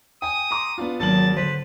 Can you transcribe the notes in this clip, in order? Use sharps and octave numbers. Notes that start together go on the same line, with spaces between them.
G5 G#5 D#6
A#5 C6 D6
B3 D4 F4
G#1 F#3 A#3 A5 F#7
D3 B4 C5